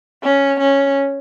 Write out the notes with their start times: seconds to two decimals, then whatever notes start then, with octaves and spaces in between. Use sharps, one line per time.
0.23 C#4
0.59 C#4